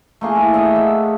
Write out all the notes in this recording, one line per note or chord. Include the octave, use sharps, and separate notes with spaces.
A3 A#3 G#4
E4
D#5 E5 F#5
E5